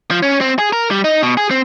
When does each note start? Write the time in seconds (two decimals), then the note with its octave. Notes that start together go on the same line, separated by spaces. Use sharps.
0.11 F3
0.23 C#4
0.41 C4
0.59 G#4
0.73 A#4
0.91 G3
1.04 D#4
1.23 B2
1.37 G#4
1.51 C4